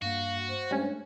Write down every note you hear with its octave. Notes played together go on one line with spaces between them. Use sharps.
G2 A#3 F#4 F5
C5
G2 G#3 A3 C#4